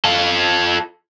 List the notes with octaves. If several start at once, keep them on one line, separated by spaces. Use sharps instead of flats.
F4 A4